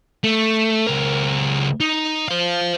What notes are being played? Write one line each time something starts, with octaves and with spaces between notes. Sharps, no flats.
A3
C#2 A#4
D#4
C5 F5